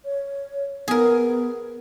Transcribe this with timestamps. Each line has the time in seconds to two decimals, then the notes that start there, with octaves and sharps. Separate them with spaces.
0.05 C#5
0.88 B3 G#4 A#4